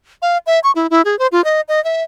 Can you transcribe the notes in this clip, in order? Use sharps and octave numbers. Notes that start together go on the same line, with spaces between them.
F5
E5
C#6
E4
E4
G#4
C5
F4
D#5
D#5
E5